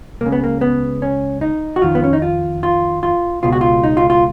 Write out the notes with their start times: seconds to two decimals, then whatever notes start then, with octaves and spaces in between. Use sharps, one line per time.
0.21 C#2 C#3 A#3
0.32 B3
0.44 A#3
0.61 B3
1.02 C#4
1.41 D#4
1.76 F#4
1.82 F2 D#3 F4
1.95 B3
2.04 C#4
2.13 D#4
2.22 F4
2.63 F4
3.03 F4
3.43 C#2 B2 F4
3.52 F#4
3.61 F4
3.84 D#4
3.97 F4
4.10 F4